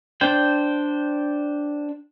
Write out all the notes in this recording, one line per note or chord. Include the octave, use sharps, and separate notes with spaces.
D4 C5 G5